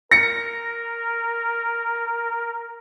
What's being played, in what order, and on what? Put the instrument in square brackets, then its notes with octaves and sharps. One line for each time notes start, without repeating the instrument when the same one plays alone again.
[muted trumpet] A#4 [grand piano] A#6 C#7